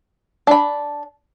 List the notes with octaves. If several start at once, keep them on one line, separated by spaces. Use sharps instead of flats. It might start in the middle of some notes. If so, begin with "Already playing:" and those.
D4 B5